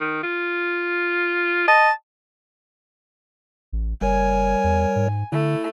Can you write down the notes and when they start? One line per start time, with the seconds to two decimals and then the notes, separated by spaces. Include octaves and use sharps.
0.01 D#3
0.23 F4
1.68 D#5 A5
3.73 A1
4.01 F#1 G3 A#4 C#5 G#5
4.64 E2
4.96 G#2
5.32 D3 A3 E4